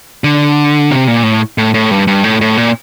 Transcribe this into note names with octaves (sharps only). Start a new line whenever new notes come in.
D3
C3
A#2
A2
A2
A2
G2
G2
A2
A2
A#2